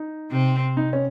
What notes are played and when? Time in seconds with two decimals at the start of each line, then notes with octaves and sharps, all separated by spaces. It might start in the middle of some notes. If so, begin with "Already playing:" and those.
Already playing: D#4
0.31 C3 C4
0.77 D#4
0.93 C#4